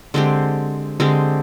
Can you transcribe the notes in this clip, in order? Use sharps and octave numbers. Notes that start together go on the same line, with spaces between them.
D3 G#3 C4 G4
D3 G#3 C4 G4